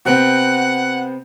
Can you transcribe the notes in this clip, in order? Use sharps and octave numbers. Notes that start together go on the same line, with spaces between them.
C3 B3 C4 F#5